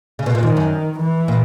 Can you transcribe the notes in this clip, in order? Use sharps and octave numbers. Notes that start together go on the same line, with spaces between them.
C#3
B2
A#2
G#2 D#3
F#2
E3
A#2